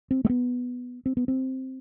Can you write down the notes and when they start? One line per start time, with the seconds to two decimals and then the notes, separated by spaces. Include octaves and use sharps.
0.11 C4
0.25 A3
0.30 B3
1.06 C4
1.17 B3
1.28 C4